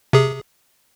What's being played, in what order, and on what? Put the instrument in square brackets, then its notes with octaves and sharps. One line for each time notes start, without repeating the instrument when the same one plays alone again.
[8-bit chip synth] C3 G#4